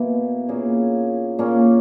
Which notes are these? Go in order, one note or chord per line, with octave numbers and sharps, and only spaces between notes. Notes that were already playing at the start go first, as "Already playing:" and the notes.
Already playing: B2 A#3 E4
A#2 A#3 C#4 G#4
A#2 A#3 C#4